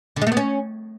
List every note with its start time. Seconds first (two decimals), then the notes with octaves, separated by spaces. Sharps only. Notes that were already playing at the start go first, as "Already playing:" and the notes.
0.16 D3
0.22 G#3
0.27 A3
0.32 B3
0.37 C#4